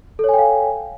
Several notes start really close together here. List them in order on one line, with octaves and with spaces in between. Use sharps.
A4 C#5 G#5 G5 F5